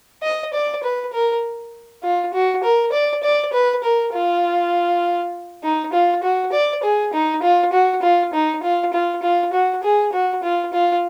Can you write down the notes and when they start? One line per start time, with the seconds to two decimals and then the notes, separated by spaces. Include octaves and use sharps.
0.23 D#5
0.53 D5
0.83 B4
1.13 A#4
2.03 F4
2.34 F#4
2.63 A#4
2.92 D5
3.23 D5
3.53 B4
3.83 A#4
4.13 F4
5.63 D#4
5.93 F4
6.23 F#4
6.52 D5
6.83 G#4
7.13 D#4
7.42 F4
7.73 F#4
8.02 F4
8.33 D#4
8.63 F4
8.93 F4
9.23 F4
9.53 F#4
9.83 G#4
10.12 F#4
10.43 F4
10.73 F4